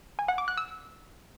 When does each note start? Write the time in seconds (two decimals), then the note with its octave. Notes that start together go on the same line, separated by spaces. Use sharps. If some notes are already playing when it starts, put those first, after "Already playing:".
0.19 G#5
0.28 F#5
0.38 D6
0.48 F#6
0.57 E6